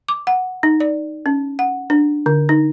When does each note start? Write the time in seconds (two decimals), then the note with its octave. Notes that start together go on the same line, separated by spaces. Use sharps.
0.08 D6
0.27 F#5
0.63 D#4
0.80 D5
1.26 C#4
1.59 F#5
1.90 D4
2.26 D3
2.49 D#4